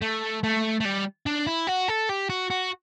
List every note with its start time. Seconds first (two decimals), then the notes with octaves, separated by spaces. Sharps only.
0.02 A3
0.43 A3
0.80 A3
0.85 G3
1.26 D4
1.46 E4
1.67 F#4
1.88 A4
2.09 G4
2.30 F#4
2.51 F#4